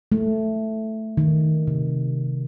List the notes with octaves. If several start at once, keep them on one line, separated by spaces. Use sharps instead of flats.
A3
D#3
C3